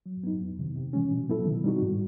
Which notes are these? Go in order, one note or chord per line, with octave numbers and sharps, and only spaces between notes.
F#3
B3 D#4
F2
C3 D#3
C3
E3 G#3 C#4
B2
F#3 B3 E4 A4
D#3
G3 C4 D#4 F#4
G#2